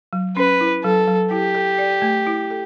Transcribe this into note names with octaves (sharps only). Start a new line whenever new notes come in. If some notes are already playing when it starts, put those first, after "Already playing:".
F#3
C#4 B4
E4
F#3 A4
F#3
E4 G4
A4
D5
A3
E4
A4